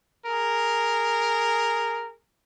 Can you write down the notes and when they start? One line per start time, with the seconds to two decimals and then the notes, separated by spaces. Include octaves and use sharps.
0.25 G#4 A#4